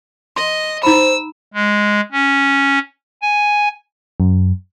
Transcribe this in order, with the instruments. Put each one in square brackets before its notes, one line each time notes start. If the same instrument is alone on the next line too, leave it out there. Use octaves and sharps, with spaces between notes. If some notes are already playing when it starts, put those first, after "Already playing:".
[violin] D#5 [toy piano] C6
[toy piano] D#4 A#5 B5 [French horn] C5 [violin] E6
[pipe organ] G#3
C#4
G#5
[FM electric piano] F#2